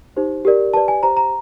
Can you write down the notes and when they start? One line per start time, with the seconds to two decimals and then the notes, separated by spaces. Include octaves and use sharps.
0.16 D#4 G4 C5
0.45 G4 A#4 D5
0.73 G4 B4 D5 A5
0.88 G#5
1.02 G4 C5 A#5
1.17 A#5